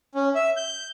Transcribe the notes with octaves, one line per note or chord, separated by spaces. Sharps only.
C#4
E5
G6